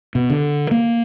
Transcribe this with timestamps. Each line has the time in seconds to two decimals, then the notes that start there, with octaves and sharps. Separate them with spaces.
0.15 B2
0.30 D3
0.71 A#3